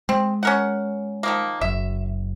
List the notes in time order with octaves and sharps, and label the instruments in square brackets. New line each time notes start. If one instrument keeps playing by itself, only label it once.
[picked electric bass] G#3 [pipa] C4
[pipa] C#4 A#4 F#5
D#3 F3 A#3
[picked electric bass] F#1 F#2 [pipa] E5